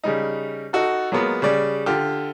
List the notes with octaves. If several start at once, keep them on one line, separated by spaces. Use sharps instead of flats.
C#3 G3 D#4
D#4 F#4 A4
F#3 G#3 A#3 B3 F4
C#3 G3 D5
D3 F4 G4